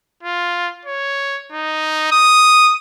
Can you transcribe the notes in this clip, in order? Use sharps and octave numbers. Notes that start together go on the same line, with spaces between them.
F4
C#5
D#4
D#6